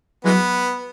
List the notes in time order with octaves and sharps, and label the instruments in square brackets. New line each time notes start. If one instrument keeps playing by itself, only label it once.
[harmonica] E3 G#3 B3 [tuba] F#3